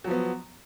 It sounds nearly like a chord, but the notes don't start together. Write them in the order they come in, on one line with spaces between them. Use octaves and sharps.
F#3 F3 B3